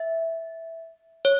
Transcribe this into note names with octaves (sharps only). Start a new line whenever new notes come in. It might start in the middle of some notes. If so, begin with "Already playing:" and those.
Already playing: E5
C#5